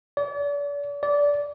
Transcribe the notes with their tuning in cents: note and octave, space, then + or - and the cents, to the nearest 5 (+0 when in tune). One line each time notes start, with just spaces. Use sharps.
D5 -40
D5 -20